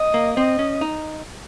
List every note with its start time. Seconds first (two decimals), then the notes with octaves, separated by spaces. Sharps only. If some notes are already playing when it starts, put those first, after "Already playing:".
Already playing: D#5
0.14 A#3
0.36 C4 D#5
0.59 C#4
0.81 D#4